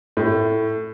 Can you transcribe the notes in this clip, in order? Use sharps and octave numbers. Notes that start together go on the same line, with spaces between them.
A2